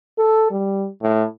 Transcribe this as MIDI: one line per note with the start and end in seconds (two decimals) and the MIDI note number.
0.18 0.49 69
0.51 0.87 55
1.02 1.25 45